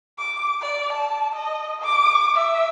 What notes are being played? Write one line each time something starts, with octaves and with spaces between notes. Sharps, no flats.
D6
D5
A5
D#5
D6
E5